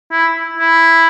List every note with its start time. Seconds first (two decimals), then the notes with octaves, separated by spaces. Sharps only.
0.12 E4
0.57 E4